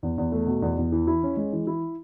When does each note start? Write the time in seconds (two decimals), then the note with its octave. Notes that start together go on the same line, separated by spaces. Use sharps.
0.03 E2
0.18 E2
0.32 A3
0.47 B2
0.62 E2
0.78 E2
0.92 E3
1.07 E4
1.23 C#4
1.37 G#3
1.52 E3
1.67 E4